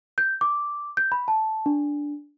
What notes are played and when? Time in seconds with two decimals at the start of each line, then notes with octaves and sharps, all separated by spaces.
0.18 G6
0.41 D6
0.97 G6
1.12 B5
1.28 A5
1.66 D4